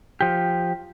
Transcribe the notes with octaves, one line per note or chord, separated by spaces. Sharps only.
F3 G4